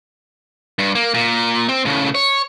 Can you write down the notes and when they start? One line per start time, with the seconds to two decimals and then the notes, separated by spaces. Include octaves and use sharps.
0.79 G2
0.95 A#3
1.14 A#2
1.69 C4
1.85 A2 C#3
2.15 C#5